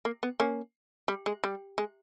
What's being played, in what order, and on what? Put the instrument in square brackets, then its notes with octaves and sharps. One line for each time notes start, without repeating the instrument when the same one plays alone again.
[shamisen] A#3
B3
A#3 C#4
G3
G#3
G3
G#3